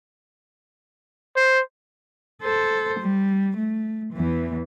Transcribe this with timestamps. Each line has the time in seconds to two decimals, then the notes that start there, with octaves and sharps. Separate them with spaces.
1.36 C5
2.43 A4 C5
3.00 G3
3.57 A3
4.13 E2 E3